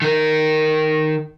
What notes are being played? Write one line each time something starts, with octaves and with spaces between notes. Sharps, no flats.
D#3 A#4